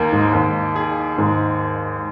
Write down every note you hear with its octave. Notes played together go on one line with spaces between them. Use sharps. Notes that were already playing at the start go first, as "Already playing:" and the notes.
Already playing: D#2 A#3
G#2
D#2
G#4
D#2 G#2